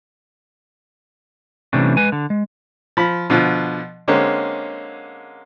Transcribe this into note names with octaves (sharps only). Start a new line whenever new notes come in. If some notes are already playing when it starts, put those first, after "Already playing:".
C3 E3 G3 A3 C#4 D4
G#3 B4 G#5
D3
G#3
F3 B5
B2 D3 F3
D3 G#3 A#3 C4 C#4